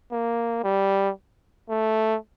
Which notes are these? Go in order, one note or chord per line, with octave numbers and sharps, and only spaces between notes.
A#3
G3
A3